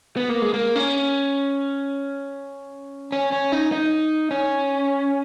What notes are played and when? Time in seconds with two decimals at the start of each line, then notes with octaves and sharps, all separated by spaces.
0.17 B3
0.29 A#3
0.42 G#3
0.54 A#3
0.76 C#4
3.12 C#4
3.32 C#4
3.52 D#4
3.72 D#4
4.31 C#4